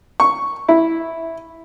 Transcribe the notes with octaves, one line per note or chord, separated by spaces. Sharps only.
C#6
E4